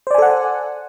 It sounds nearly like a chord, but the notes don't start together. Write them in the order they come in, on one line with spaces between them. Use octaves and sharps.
C5 D5 G#5 A4 F#5